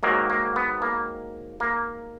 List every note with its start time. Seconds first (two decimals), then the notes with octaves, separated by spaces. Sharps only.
0.03 G#2 D#3 F#3 A#3
0.30 A#3
0.56 B3
0.82 A#3
1.60 A#3